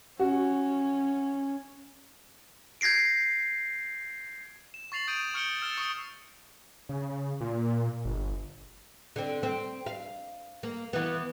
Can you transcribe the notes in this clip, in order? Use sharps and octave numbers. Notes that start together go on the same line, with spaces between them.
C#4 F#4
G6 G#6 A#6 C7 D7
E7
C#6 A6 C7 F7 F#7
D#6 G6 D7 D#7
C#6 F6 G6 C#7 D7 G7
E6 F6 A6 E7 G7
C#6 D#6 C#7
C#3
A#2
G1
D3 C4
C4
F5
A#3
E3 B3